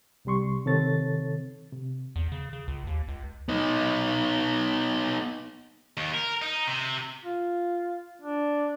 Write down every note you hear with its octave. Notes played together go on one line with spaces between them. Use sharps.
C2 C3 G3 C6 C#6
C3 D#3 C4 A4 C#5 A6
C3
E2
C#3
C#3
C#2
D#2
C#2
B3 D#4
D#2
A#4
D#4
C3
F4
D4